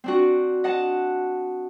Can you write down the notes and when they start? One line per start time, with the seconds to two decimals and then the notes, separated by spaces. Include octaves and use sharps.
0.04 C4 D4 F#4
0.64 D#5 F#5 A5